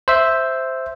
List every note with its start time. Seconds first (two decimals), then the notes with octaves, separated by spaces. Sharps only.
0.08 C5 E5